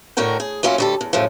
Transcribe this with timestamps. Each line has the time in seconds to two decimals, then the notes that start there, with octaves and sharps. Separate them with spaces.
0.17 A2 D3 F#4 A#4 G5
0.40 G#4
0.63 F#3 A#3 C#4 E4 F4
0.78 D2 G3 A4
1.01 E2
1.13 F#2 A2 C#3 F3